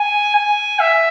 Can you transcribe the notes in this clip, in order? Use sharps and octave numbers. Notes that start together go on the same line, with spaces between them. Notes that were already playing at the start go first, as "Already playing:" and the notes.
Already playing: G#5
G#5
E5